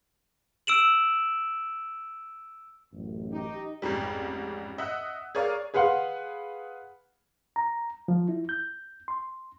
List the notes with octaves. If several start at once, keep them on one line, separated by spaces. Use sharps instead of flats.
E6 D7 E7 F#7
A1 F#2
D#4 G4
A1 F2 G#2 G3
D#5 E5 F#5 E6 F#6
G#4 A#4 C#5 D5 F5
G#4 B4 F5 F#5 C6
A#5
F3
E4
G6
C6